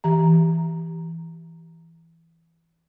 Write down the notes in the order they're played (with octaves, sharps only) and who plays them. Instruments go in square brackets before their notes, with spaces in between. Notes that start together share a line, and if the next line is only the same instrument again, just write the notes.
[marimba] E3 G4 A#5